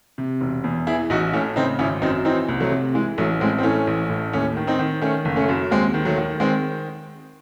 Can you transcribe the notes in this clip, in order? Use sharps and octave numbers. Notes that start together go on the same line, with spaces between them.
C3
E1
E2
E3 E4 G#4
A1 D#4 F#4
A2 C#4 E4
C#3 C4 D#4
G#1 C#4 E4
F#2 C4 D#4
E3 C4 D#4
C2
F#3 A3
C3
E3 G#3
A1 F#3 A3
A2 G#3 C4
C4
E3 A3 C#4
A1
A2
D#2 A3 C#4
D#3
C4 D#4
D#3
D#3 A3 C#4
F#1
A3 C#4
F#2
D#2 G#3 C4
D#3
F#3 A3
D#3
D#3 G#3 C4